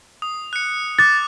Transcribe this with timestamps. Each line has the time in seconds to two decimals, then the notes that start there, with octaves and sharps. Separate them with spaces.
0.22 D#6
0.53 F#6 C#7
0.99 D6 F#6 A6